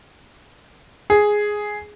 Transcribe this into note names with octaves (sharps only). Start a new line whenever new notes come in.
G#4